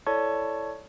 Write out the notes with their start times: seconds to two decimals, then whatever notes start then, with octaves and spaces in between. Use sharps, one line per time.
0.06 E4 A4 C#5 D5 A5 C#6